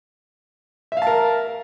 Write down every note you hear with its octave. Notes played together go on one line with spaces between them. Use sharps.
A#4 E5 F5 A5